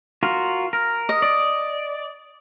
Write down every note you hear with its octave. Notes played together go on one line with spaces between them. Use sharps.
F4 F#4 A#4
A#4
D#5
D5